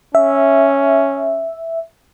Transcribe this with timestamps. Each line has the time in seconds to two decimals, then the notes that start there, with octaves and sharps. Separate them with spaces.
0.15 C#4 E5